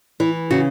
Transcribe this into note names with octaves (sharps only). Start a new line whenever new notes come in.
E3 E4
C#3 F#4